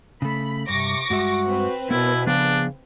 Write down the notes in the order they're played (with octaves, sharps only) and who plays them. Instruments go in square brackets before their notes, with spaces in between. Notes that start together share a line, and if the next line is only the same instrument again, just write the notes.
[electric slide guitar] C#3 A3 [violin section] B5
[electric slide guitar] G2 [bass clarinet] C3 [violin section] C#6 D6 A#6
[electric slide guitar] G2 G#3 E5 [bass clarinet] F#4
[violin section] C4 B4
[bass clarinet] B2 [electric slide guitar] B3 A#4 [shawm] E4
[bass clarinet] C#3 [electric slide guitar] F3 B3 G#4 [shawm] D4